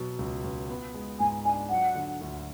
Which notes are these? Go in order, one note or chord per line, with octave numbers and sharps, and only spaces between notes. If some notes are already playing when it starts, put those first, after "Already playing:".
Already playing: B2 F#3
C#2
C#2
B3
G#3
G#2 G#5
D4 G#5
F#3 F#5
D3
D2